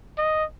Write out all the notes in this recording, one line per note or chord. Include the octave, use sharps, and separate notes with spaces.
D#5